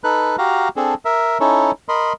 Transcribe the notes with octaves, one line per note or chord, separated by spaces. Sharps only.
D#4 A4 B4 F#6
F#4 G4 F5 A#5
C4 D4 G#4 A4
A#4 E5
C#4 D#4 E4 A4 C#5
A#4 D#5 B5 C6